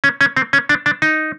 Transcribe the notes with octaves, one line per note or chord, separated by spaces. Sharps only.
C#4
C#4
C4
C#4
D4
D4
D#4